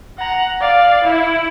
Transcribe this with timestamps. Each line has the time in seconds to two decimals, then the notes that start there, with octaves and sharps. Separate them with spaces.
0.18 F#5 A#5
0.61 D5 F5
1.04 E4